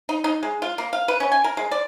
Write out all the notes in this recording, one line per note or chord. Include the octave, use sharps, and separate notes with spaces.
D#4
D#4
G#3
F4
A#3
F5
B4
C#4
G#5
A#4
G#3
D5